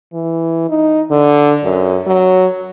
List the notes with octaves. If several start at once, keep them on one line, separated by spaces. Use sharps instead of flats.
E3
D#4
D3
F#2
F#3